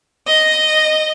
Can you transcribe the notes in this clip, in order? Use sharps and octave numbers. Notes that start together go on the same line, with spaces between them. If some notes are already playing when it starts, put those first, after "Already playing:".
D#5